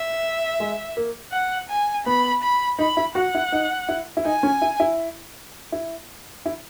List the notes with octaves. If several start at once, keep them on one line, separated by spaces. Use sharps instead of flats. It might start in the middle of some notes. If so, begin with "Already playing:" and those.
Already playing: E5
G#3
A#3
F#5
G#5
B3 B5
B5
D#4 B5
E4
F#4 F#5
E4
D#4
E4
E4
D#4 G#5
C#4
E4
E4
E4
E4